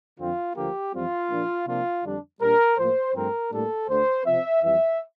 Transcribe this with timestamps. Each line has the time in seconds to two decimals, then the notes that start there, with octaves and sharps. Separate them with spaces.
0.18 F2 D3 F3 C4 F4
0.55 D2 D3 F3 A#3 G4
0.92 F2 E3 G3 C4 F4
1.29 A#2 F3 A#3 D4
1.66 C3 F3 A#3 D4 F4
2.03 F2 D3 G3 D4
2.40 A#2 G3 A#3 D4 A#4
2.77 A2 F3 A#3 C5
3.14 G2 F3 A3 C4 A#4
3.51 A2 G3 A#3 D4 A4
3.88 D2 D3 A3 C5
4.25 C3 F3 C4 E5
4.62 F2 E3 G3 E5